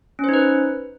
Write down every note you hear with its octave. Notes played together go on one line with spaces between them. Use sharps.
C#4 D#4 B4 C5